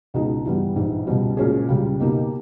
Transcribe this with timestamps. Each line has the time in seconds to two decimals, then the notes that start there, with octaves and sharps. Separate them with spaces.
0.14 C#2 B2 G#3 D#4
0.45 G2 E3 G3 B3
0.76 A#1 G#2 E3
1.07 C#2 B2 G3
1.37 A#2 G#3 C#4 G#4
1.68 C#2 C#3 G3
2.00 B2 A#3 D#4 G4